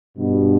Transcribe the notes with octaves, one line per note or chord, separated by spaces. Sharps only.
G2 B2